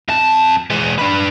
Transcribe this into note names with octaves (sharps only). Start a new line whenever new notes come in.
F2 A5
E3 G#3
D4 B4